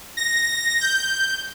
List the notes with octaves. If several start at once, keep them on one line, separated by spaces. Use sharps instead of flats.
A#6
G6